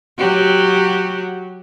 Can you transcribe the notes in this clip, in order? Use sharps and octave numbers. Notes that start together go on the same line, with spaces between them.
F#3 F#4 G4